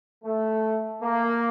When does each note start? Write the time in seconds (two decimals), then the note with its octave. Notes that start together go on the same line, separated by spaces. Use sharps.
0.24 A3
1.02 A#3